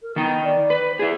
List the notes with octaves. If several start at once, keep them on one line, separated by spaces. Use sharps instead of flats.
A#4
D#3 B3 D#4
D5
B4
C5
E4 G#4